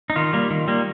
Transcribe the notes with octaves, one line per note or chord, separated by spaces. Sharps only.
D#4
D#3 F4
G3 A#3
D#3
G3 A#3